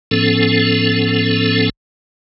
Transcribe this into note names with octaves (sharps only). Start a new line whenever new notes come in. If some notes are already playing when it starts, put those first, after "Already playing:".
A2 F3 B3 C#4 A4